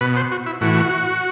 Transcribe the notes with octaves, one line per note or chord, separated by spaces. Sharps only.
B2 B4
C5
F#4
E4
A2 E3 F#4